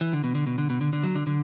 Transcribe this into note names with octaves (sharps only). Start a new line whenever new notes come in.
E3
D3
B2
D3
B2
D3
B2
D3
D3
F#3
D3
D3